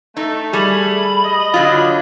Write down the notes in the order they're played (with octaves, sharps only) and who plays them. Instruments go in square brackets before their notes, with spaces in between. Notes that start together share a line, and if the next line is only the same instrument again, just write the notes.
[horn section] A3 [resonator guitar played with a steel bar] D#4
[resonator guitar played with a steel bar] G3 G#4 [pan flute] B5
[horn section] D#5
[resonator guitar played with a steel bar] D3 F#3 F4